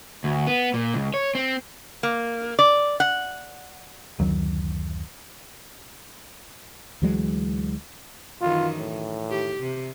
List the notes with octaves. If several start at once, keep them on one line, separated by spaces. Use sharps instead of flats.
D2
B3
A#2
C#2
C#5
C4
A#3
D5
F#5
F#1 D2 D#3 F#3
D2 E3 F#3 G#3
F#2 D#3 E3 F4
A2
D#3 G4
C3